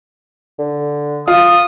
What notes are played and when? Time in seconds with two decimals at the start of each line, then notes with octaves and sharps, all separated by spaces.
0.59 D3
1.28 F4 D#6